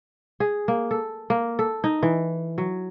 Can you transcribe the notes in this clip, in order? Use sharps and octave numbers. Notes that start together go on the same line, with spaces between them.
G#4
A#3
A4
A#3
A4
D#4
E3
F#3